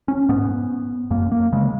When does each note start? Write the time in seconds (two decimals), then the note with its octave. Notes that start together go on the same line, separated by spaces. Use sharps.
0.08 C#4
0.29 G#2 B3
1.11 F#2 A#3
1.32 A#3
1.53 C#3 G#3